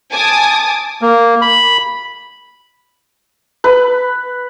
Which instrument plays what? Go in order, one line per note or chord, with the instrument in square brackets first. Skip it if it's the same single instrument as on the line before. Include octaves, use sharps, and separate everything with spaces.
[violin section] G#5 A5 D6 D#6
[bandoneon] A#3
B5
[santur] B4